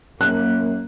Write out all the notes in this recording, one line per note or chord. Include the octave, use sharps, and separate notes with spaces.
F#2 A#3 F#6